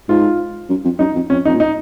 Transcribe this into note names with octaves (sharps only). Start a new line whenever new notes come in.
G#2 F4
F#2
F2
F#2 D#4
F2
F2 C#4
F2 D#4
A#2
D#4